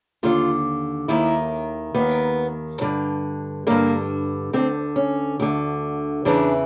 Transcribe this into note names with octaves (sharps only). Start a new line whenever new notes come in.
D#2 D3 F4
D#2 D#3 E4
D#2 D#3 B3
G2 D3
G2 D3 A#3
D2 D3 C4
C#4
D2 D3
E2 C#3 E3 D4